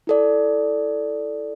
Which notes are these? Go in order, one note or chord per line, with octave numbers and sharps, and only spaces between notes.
E4 A4 D5